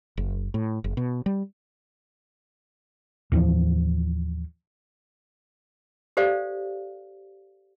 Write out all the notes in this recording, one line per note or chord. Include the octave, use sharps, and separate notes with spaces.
F#1
A2
F#1
B2
G3
D#2 A2 E3 F3
G4 A4 C5 D5 F5